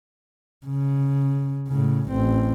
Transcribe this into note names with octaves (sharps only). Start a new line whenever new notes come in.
C#3
A2 C#3
A1 C4